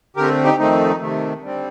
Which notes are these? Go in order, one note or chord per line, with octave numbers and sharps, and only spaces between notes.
D3 A3 C4 G4 A#4
D#4 G4
F2 D#3 A3 C4 D#4
C3 D#3 A3
D3 G3 C4